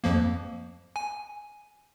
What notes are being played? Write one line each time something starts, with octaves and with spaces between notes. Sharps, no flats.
F2 F3 A#3
G#5